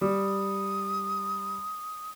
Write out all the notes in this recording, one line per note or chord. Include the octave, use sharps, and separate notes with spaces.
G3 D#6